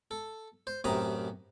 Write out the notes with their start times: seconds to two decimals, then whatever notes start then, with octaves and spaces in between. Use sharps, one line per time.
0.11 A4
0.67 C5
0.84 A1 F#2 C3 A#5 B5 D#6